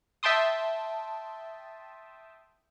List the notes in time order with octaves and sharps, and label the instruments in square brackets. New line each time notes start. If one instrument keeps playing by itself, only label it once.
[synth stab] E5 G5 A5 C6 D#6